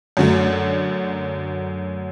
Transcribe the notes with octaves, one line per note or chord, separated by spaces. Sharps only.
F#2 D3 F#3 A3